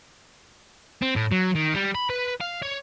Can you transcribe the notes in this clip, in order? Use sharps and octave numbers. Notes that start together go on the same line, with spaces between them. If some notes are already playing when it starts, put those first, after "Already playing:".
C4
A2
F#3
D#3
G3
B5
B4
F5
C#5